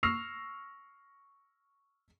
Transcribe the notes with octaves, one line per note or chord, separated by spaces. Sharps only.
C#6 E6 F6 A#6 C7 F7